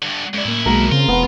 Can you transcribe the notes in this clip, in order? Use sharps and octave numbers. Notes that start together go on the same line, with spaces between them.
G2 D3
F#2 G#3 E4 D5
A2 A#3
B1 G#3 A#3 F#4 A#4
C#3 C4 F4
E1 B3